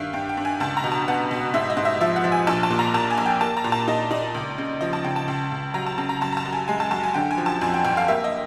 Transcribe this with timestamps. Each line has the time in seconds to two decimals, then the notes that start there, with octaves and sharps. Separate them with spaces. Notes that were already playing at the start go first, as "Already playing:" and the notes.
Already playing: G2 D#3 E5 F5
0.13 G2 G5
0.29 G5
0.37 G2
0.45 G#5
0.60 C#2 A5
0.77 A#5
0.84 B2
0.92 A5
1.08 B3 F#5
1.31 B2
1.54 G#2 E5
1.70 D#5
1.77 G#2
1.85 E5
2.01 F3 E5
2.16 F#5
2.24 F3
2.32 G#5
2.47 A#1 A5
2.63 A5
2.70 A#2
2.79 A#5
2.94 A#2 A5
3.10 G#5
3.18 A#1
3.26 G5
3.41 A#3 A5
3.57 A#5
3.64 A#2
3.72 A5
3.88 D#4 D#5
4.11 D#4 D5
4.34 C#2
4.58 C#3
4.81 F3 D#5
4.93 A5
5.04 C#3 G5
5.16 A5
5.28 C#2
5.51 C#2
5.74 F#3 A#5
5.86 A5
5.98 C#3 A5
6.09 A#5
6.21 F#2 A5
6.32 A#5
6.37 A5
6.45 F#2
6.53 G#5
6.68 G#3 G#5
6.80 A5
6.91 F#2 A5
7.03 G#5
7.14 D3 G5
7.31 G#5
7.38 F3
7.46 A5
7.61 F2 G#5
7.74 G5
7.85 G1 G5
7.97 F5
8.08 A#3 E5
8.24 D#5